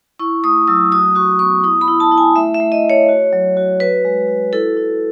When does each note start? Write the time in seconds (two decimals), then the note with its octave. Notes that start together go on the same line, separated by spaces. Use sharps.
0.19 E4 C#6
0.44 A3 D#6
0.68 F#3 E6
0.92 F#4 D#6
1.15 F#4 C#6
1.39 B3 C#6
1.63 E4 D#6
1.81 B5
1.88 E4
2.00 A5
2.11 E4
2.18 G#5
2.36 A3 E5
2.55 E5
2.60 A3
2.72 D#5
2.85 A3 C#5
3.09 F#4
3.33 F#3
3.57 F#4
3.80 F#4 B4
4.05 G#3
4.28 F#4
4.53 E4 A4
4.77 E4